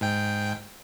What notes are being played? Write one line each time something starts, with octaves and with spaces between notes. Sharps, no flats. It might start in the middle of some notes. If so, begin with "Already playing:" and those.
G#2 G5